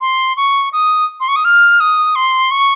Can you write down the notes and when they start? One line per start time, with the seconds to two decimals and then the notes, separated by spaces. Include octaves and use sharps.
0.01 C6
0.37 C#6
0.73 D#6
1.20 C6
1.28 C#6
1.36 D#6
1.45 F6
1.80 D#6
2.15 C6
2.51 C#6